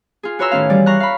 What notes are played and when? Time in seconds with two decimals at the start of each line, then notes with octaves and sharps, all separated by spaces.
0.23 F4 G#4
0.39 F#4 B4 C#5 A#5 C6 E6
0.51 A2 D#3 C#4 F5
0.70 E3 G3 D5
0.86 F5 A#5 C#6 F#6
1.00 F5 B5